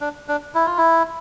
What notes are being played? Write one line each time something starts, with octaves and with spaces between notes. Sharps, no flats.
D4
D4
E4
F4
E4